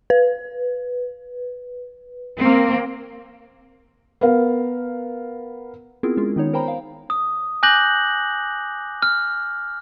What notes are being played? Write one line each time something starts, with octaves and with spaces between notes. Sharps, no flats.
B4
A#3 C4
B3 A#4 F5
B3 C4 E4 F4 G#4 A#4
G#3 C#4 F4 G#4
D#3 B3 D#4 C#5
A#4 C5 G5 A#5 B5
F5
D#6
G#5 D6 F#6 G6 A#6 F#7
F6